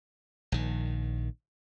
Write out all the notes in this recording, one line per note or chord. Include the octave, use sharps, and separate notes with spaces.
A#1 D#3